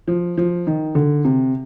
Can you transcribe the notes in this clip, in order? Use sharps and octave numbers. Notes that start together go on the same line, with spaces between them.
F3
F3
D#3
D3
C3